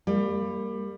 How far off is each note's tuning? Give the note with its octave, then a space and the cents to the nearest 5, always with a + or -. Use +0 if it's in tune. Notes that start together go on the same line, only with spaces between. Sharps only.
G3 +20 A#3 -10